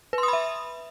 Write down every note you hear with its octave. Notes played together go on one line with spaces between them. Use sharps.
B4
C6
D#6
B5
E5